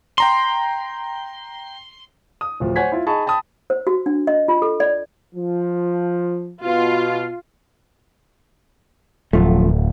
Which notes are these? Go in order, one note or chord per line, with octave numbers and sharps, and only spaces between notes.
G5 A#5 C6 C7
D#6
D1 F3
C5 C#5 F#5 G#5 G#6 B6
E4 F4
D#4 G#4 A5 B5 C#6
G5 A5 B5 D#6
C5
F#4
D4
D#5
F4
A4
D5
F3
B2 F4
D1 F#2 F3 A3